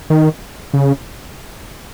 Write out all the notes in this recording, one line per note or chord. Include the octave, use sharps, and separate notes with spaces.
D#3
C#3